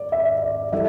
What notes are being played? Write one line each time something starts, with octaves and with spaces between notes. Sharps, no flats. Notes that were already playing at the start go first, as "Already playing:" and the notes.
Already playing: D5
E5
D5
E3 G3 E4 A4 E5